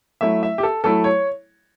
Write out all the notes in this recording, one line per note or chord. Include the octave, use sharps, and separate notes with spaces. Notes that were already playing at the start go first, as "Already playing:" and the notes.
F#3 A3 E4 E5
E5
G4
A4
F#3 A3 E4 A4
C#5